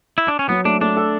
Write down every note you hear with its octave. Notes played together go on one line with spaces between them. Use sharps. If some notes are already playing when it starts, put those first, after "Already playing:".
E4
D4
C#4
F#3 B3
A3 D4
A3 D4
A4